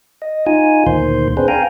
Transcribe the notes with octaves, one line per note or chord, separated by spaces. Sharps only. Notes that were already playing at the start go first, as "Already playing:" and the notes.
D#5
D#4 F4 G#5
D2 A#2 D#3 C5 C6
C4 D4 G#4 B4 C5
F5 G5 G#5 A#5